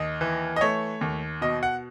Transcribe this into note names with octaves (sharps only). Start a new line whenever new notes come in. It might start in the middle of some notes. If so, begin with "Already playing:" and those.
Already playing: D#2 D#5
E3
D#5
A3 C#5
D#2
B2 D#5
F#5